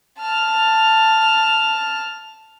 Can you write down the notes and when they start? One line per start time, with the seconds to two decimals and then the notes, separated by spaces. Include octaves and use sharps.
0.19 A5 F6